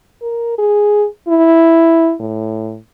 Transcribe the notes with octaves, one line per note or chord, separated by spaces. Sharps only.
A#4
G#4
E4
A2